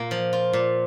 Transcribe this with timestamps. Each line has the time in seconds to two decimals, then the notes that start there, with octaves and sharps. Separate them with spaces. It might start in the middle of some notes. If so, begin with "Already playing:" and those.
Already playing: A#2 A#3 F4
0.11 F3
0.33 F4
0.53 A#2